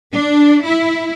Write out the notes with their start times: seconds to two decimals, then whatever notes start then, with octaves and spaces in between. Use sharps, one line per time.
0.13 D4
0.65 E4